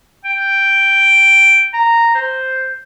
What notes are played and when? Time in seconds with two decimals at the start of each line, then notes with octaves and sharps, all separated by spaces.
0.24 G5
1.73 A#5
2.14 C5